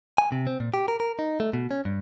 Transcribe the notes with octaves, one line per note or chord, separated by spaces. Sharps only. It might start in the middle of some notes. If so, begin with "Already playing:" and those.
G#5
C3
C4
A#2
G4
A#4
A#4
D#4
A3
B2
C#4
G2